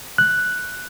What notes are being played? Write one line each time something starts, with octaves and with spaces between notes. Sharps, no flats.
F#6